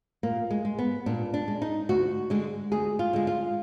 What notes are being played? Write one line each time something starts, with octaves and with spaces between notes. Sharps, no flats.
A#2 A#3
G#3
G#3
B3
A#2 D4
D4
G#3
D#4
D2 F#4
D3 G#3
D2 G#4
F4
D3 G#3
F4